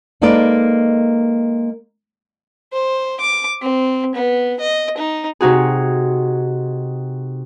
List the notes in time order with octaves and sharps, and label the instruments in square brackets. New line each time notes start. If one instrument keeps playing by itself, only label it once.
[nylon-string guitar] G#3 A#3 D#4 A4 B4 D5
[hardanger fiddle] C5
D6
C4
B3
D#5
D#4
[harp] C3 D#4 F#4 G#4